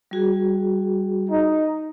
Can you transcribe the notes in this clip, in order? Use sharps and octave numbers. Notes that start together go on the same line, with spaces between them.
G3 F#4 G#4
D#4